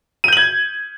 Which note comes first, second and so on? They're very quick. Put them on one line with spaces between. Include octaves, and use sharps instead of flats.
D#7 G6 F#7 G#6